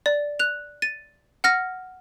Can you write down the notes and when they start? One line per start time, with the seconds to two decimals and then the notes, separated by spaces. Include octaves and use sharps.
0.06 D5
0.39 F#6 F7
0.82 A6 D#7
1.44 F#5 F6 A#6